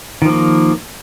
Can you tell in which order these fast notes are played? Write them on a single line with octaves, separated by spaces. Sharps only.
D#3 F3 A#3